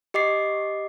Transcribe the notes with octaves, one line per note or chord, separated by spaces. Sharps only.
G4 D#5 D6 C7